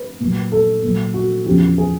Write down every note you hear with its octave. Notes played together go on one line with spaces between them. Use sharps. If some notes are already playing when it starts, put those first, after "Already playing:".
Already playing: B4
A#2 F#3
A4
A#2 F#3
F#4
E2 C#3 F3 G4
G#4